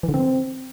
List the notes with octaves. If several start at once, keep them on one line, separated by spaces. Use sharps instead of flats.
E3
D3
C4